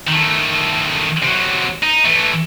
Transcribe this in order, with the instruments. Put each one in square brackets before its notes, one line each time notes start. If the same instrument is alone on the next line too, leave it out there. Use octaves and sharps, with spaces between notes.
[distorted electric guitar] D#3 A3
C3 F#3
D#4
E3 A3